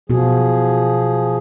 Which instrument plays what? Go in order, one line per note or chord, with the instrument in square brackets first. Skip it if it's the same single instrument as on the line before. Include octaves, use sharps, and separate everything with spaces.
[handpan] B2 F#4 [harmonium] F3 G#4